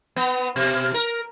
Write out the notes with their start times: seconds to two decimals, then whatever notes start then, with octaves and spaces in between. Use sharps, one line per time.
0.16 B3
0.56 B2
0.94 A#4